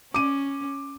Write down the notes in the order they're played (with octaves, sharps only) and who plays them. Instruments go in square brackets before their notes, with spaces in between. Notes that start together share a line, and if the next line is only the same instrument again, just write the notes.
[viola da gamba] C#4 [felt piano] D6 D#7